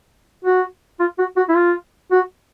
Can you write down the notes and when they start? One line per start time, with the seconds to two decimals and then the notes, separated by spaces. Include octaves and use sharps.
0.44 F#4
0.99 F4
1.18 F#4
1.37 F#4
1.49 E4
1.55 F4
2.11 F#4